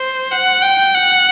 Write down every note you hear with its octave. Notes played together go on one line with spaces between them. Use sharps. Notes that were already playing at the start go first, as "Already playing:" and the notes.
Already playing: C5
F#5
G5
F#5